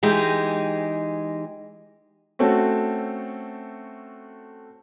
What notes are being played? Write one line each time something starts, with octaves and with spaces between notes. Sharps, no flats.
E3 G#3 D#4 G4 G#4
A3 C4 C#4 F#4 A4